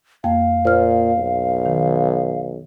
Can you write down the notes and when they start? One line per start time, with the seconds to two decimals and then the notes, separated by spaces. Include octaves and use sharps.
0.24 F2 A#3 F5 G5
0.65 A#2 C5 F6
1.19 B1
1.66 D#3